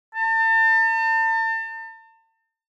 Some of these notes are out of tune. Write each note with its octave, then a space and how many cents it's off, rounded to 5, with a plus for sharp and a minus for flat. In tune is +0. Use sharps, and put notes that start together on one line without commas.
A5 +40